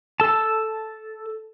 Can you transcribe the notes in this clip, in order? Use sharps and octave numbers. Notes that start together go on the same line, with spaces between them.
A4 A5